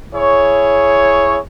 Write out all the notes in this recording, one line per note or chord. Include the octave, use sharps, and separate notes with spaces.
E4 G#4 C#5